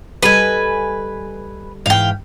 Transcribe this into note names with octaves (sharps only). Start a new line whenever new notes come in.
G3 A4 B4 D#5 G#5
G#2 E3 F5 G5